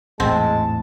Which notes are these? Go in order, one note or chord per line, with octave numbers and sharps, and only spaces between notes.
A1 E2 G#2 G#3 C4 A5